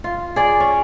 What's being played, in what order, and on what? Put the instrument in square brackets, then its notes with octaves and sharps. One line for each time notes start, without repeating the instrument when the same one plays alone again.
[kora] F4
G#4 D5
C#4